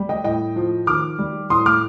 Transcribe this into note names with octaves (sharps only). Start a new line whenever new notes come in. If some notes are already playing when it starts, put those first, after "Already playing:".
Already playing: G3
D#5 G5
A2 D#5 G5
F3
D#3 D6 F6
G3
A2 C6 D#6
D6 F6